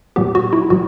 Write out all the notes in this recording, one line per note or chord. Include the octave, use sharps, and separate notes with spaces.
A#2 F#3 B3 G4
F#4
E4
A#2 F#3 F#4